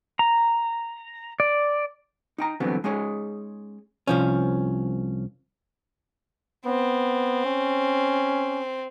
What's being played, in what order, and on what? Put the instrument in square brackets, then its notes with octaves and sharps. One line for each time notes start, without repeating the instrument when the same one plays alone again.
[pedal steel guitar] A#5
D5
[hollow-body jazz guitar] D#4 G5 A#5
G2 D3 E3 F#3 B3 C4
G#3 C#4 D#4 G#4 C#5
C2 F3 C#4
[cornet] B3 [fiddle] C4
[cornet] C#4